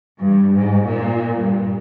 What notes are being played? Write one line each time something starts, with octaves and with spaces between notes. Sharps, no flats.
G2
G#2
A#2
G2